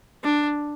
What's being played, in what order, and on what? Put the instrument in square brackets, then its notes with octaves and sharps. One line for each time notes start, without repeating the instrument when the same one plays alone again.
[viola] D4